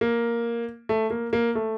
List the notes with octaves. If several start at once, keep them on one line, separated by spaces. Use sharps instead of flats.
A#3
A3
A#3
A#3
A3